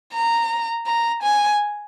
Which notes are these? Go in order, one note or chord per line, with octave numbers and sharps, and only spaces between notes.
A#5
A#5
G#5